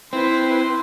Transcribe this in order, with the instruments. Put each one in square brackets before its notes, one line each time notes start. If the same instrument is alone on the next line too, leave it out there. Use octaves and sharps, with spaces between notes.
[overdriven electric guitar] C4 [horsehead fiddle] E4 B4 [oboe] C6